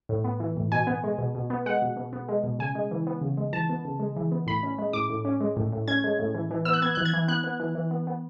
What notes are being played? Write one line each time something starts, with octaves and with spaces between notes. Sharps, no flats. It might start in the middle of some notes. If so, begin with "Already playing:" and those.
A2
B3
E3
A2
B2 G#5
B3
G#3
B2
B2
B3
G#3 F#5
B2
B2
B3
G#3
B2
C#3 G#5
G#3
E3
B3
C#3
G#3
E3 A5
B3
C#3
G#3
E3
B3
A2 B5
C#4
G#3
A2 D6
A2
C#4
G#3
A2
A2
C#4 G#6
G#3
A2
E3
E3
B3 E6
F#6
B3 G#6
E3 F#6
G#6
E3
B3 F#6
B3
E3
E3
B3
B3